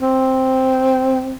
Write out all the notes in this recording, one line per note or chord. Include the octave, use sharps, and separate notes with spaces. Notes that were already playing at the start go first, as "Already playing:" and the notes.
C4